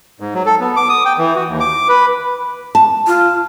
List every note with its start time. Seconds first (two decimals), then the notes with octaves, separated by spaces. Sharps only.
0.20 G#2
0.34 F#3
0.46 A4
0.60 B3
0.76 D6
0.89 D#6
1.05 G5
1.18 E3
1.36 F#4
1.48 D#2
1.60 D6
1.89 B4
2.75 A5
3.07 F4